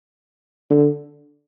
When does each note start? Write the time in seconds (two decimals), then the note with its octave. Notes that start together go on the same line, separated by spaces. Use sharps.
0.70 D3